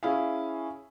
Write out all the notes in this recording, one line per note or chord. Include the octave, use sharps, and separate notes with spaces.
C#4 E4 G#4 F5